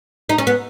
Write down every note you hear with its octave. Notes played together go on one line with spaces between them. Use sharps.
D#4
C#4
B3